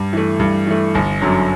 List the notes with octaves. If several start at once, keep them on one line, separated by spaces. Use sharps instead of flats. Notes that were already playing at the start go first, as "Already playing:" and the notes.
Already playing: G2
E3 A3
G2
E3 A3
G1
F#2 D3 F#3